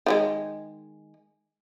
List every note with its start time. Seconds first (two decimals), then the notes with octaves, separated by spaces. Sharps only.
0.06 D#3 G3 G#3